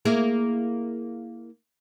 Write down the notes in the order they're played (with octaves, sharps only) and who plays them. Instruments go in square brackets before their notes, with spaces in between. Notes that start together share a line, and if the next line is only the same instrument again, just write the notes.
[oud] A#3 E4 G#4